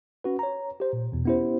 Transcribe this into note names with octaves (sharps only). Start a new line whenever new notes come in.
C#4 F#4 B4
C#5 A#5
G4 C5
A#2
E2 B2
B3 C#4 E4 G4 C5